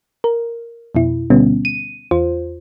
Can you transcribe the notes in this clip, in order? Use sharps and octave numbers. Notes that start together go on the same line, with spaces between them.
A#4
F2 B2 E4
D2 B2 D3 G3 B3 C#4
D#7
E2 F4 C5